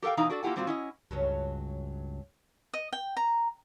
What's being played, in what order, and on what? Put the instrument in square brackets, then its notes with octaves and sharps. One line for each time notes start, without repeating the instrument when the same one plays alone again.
[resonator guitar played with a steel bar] G4 A4 A#4 F5 G5
B2 E3 D#4 F5 A#5
D4 F#4 A4 D5
A#3 E4 F4 G4 F#5 G#5
A#2 G3 C4 F4 F#4
C#4 E4 D#5
[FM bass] C#2 [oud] G2 F#3 C#4
[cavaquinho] D#5
G5
A#5